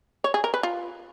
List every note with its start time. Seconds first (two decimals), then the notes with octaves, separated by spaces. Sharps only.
0.24 C#5
0.34 G#4
0.44 A#4
0.54 B4
0.63 F4